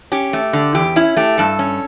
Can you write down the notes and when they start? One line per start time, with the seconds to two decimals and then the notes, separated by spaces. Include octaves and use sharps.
0.12 C#4 G4
0.33 A3
0.53 D3
0.75 E2 G4
0.96 C#4 E4
1.17 A3 G4
1.38 G2 A4
1.59 C#4